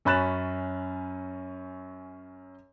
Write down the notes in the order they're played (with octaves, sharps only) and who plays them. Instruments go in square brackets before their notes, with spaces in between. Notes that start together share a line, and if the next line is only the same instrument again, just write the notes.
[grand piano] F#2 C#4 B5 F#6 A6 E7